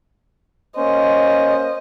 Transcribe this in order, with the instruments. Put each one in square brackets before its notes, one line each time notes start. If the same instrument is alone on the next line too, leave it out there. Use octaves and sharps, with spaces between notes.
[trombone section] A#3 C#4 C5 [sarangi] D#5